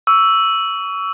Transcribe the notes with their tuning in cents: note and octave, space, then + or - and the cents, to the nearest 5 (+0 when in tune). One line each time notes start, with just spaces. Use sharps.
C#6 +30 E6 +0